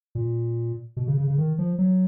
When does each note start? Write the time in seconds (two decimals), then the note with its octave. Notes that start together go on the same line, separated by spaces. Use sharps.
0.15 A#2
0.97 B2
1.07 C#3
1.17 C#3
1.27 C#3
1.38 D#3
1.58 F3
1.78 F#3